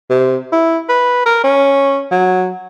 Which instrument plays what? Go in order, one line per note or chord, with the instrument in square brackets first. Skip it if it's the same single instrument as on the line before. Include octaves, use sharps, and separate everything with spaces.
[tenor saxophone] C3
E4
B4
A#4
C#4
F#3